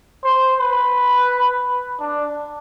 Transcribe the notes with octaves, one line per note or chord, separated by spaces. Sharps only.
C5
B4
D4